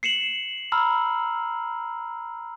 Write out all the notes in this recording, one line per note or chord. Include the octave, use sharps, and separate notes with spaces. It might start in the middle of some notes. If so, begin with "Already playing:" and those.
C7 C#7 E7 F#7
A#5 B5 E6 F6